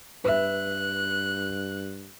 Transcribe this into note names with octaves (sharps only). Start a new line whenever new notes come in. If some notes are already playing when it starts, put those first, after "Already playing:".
G2 B4 E5 F#6